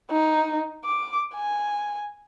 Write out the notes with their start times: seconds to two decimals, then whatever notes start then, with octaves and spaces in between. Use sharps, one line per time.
0.10 D#4
0.85 D6
1.35 G#5